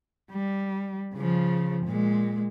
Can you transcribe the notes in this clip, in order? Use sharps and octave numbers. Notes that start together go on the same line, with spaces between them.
G3
C#3 F3
A#2 G#3